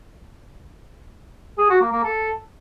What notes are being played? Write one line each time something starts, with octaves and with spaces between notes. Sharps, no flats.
G#4
F#4
A#3
A#3
A4